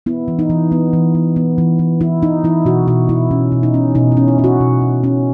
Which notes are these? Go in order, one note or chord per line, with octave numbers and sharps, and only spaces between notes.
B3 E4
E3
D#4
E3
B3
E3
B3
B3
E3
E3
E3 E4
E3 D#4
E3 E4
B2 F#4
B2 F#4
B2 E4
B2 C#4
B2
D#4
C#4
B2 D#4
E4
C#4
E4
C#4
F#4
B2
B2
C#4